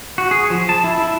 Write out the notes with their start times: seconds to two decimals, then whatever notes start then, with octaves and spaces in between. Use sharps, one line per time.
0.18 F#4
0.31 G#4
0.50 F3
0.69 A5
0.84 E4
0.98 E4